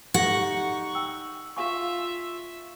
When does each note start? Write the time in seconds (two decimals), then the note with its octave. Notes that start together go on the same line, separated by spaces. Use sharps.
0.14 D#4 G4 A4 F#5 C#6 A#6
0.95 G5 E6
1.56 F4 E5 F5 G#5 C#6